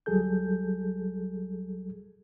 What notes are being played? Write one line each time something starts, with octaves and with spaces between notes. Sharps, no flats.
D2 F#3 G3 G#4 A4 G6